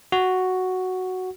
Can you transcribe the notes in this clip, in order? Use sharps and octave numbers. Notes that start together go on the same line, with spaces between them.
F#4